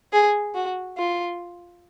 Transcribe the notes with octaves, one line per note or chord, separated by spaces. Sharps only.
G#4
F#4
F4